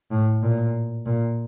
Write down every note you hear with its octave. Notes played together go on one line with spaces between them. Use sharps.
A2
A#2
A#2